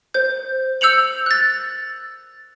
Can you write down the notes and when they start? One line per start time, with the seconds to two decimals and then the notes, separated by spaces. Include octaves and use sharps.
0.14 C5 G6
0.81 E6 G6 C#7 F7 F#7
1.26 F#6 A6